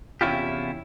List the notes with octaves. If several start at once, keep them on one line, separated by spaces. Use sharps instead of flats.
E2 C3 C#4 E4 F4 G4